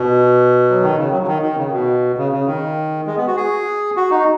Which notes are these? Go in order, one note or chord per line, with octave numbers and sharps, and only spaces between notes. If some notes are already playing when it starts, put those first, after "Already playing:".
Already playing: B2
F#3
D#3
C#3
F#3
F#3
D#3
D#3
C#3
B2
C#3
C#3
D#3
G#3
B3
F#4
G#4
F#4
D#4